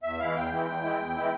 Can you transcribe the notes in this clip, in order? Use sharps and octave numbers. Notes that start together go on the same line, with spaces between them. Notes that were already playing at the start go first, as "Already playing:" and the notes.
E2 E5
E3 G#3 E4 F5
E2 G5
E3 G#3 E4
E2
E3 G#3 E4
E2
E3 G#3 E4